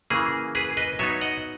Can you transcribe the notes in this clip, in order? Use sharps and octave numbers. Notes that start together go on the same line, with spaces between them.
C#3 E3 A#3 G#4
G#4 B4
B4 D#5
F#3 B3 D#4 C#5 E5
D#5 F#5